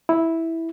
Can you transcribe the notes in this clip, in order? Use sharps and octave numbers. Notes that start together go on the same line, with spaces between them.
E4